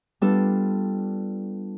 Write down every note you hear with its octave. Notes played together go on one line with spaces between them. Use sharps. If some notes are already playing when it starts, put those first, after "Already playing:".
G3 B3 D4 F4 A4